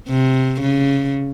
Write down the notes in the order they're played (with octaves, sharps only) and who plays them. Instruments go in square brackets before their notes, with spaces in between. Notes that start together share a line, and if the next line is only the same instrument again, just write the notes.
[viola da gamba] C3
C#3